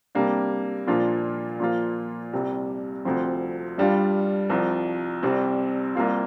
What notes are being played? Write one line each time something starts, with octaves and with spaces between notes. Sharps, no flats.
C3 G3 A#3 D4
A#2 F3 A#3 D4 F4
A#2 F3 A#3 F4
C2 C3 G3
D2 C3 F3 C4
G2 G3 D4 F4
C2 C3 F3
C2 C3 G3 C4
C2 C3 A#3 F4